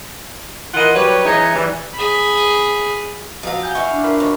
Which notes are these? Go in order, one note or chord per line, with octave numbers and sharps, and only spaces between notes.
E3 F4 A#4 D#5 F#5
F#3 G3 G4 B4 C#5
E3 D#4 G#4 C#5 D#5 E5
E3 G3
G#4 B5
F3 F#3 F5
F#5 G#5 G6
E4 F5 C#6
D4
F4 A#4 B5
F#2 C#5